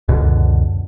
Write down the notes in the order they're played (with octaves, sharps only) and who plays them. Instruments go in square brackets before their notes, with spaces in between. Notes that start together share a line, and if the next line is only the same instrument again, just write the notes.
[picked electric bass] C#2 F#2 B2 D3